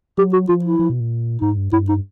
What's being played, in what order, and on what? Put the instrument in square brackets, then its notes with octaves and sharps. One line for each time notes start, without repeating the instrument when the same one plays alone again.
[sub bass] F#3 [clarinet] G4
[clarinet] F#4
[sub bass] F3 [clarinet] F4
[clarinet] E4
[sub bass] F3
B2
A#2
[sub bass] G#2 [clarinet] D#4
[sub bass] G2
[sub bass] G2 [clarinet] E4
[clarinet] D#4